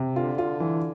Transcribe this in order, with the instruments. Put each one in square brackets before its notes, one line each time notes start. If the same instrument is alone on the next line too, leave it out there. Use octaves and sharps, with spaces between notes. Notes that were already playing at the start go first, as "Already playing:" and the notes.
Already playing: [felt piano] C3
[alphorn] D3 [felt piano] F4
[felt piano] F4
E3